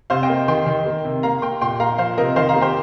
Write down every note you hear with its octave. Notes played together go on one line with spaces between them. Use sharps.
C3 C5 F5
D#5 G5
A#3
D#3 G5 C6
D#3
A#3
C3
A#3 F5 A#5
A#3 G5 C6
A#2 G5 C6
A#3 F5 A#5
F3 C5 F5
C3 A#4 D#5
D#3 C5 F5
F5 A#5
A#3
G4 C5